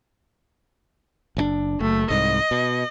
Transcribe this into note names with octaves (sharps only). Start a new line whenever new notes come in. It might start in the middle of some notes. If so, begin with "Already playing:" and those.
F#1 B2 D4
F#1 A3
C2 G#2 D#5
B2